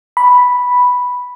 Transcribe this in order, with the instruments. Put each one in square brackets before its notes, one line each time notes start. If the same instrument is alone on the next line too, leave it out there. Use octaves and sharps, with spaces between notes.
[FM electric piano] B5